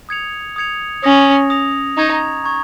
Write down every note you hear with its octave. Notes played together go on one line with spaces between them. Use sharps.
D#6 G#6 C#7 F7
D#6 G#6 C#7 F7
C#4 D#6 A#6 F7
D#6 A#6 F7
D#4 A#5 C#6 G#6
A#5 C#6 G#6